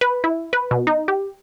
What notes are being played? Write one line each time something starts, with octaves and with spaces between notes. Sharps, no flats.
B4
E4
B4
B2
D#4
G4